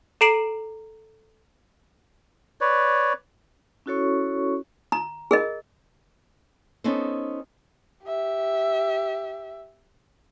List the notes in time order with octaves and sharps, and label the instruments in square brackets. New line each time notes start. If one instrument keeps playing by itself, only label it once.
[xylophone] A4 A#5 C7 D7 E7 F#7
[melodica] B4 C#5 D5
[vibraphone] C#4 E4 F#4 A4 C#5 C#6
[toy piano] A#5
G#4 A#4 D#5
[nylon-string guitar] B3 C#4 D#4 A4 C5
[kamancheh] G4 E5